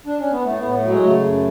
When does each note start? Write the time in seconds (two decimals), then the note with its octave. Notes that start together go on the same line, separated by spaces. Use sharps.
0.06 D4
0.19 C#4
0.31 B3
0.44 A2 A3
0.59 A2 B3
0.74 A3
0.84 F#3
0.89 G#3
1.03 C#3 A3
1.23 F#2